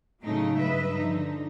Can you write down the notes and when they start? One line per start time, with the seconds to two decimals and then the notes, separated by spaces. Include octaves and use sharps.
0.23 A2 C#3 F#3 A3 C#4 D#4
0.60 G2 B4 D#5 E5
0.96 D3 F3 D#4